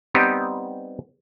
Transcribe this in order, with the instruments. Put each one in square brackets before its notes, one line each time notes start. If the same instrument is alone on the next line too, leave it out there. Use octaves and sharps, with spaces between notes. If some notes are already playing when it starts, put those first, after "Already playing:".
[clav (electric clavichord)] G3 B3 C4 D#4 G4